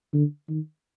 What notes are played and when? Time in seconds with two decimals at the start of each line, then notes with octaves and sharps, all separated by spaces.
0.13 D3
0.49 D#3